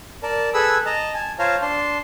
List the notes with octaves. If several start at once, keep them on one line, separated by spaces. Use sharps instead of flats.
A#4 D5 A5
G#4 A4 B4 G#5 B5 E6
D#5 A5 A#5
G#5 A5
F4 C5 C#5 F5 A5 A#5
D4 A5 C6